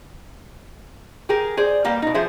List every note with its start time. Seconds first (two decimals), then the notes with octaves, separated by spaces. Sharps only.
1.29 G4 G#4 A#4
1.57 G#4 C5 D5
1.84 G3 A#3 B3 F5
2.02 B2 D#4
2.14 F3 G#4 C5 E5